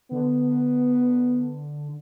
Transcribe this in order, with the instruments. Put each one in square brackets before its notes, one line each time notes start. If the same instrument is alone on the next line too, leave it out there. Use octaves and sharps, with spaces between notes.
[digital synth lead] D3 [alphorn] B3